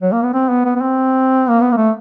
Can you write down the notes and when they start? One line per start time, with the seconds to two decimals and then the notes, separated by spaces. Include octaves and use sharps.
0.02 F#3
0.12 A#3
0.23 B3
0.33 C4
0.49 B3
0.65 B3
0.76 B3
0.81 C4
1.49 A#3
1.61 B3
1.72 A#3
1.77 A3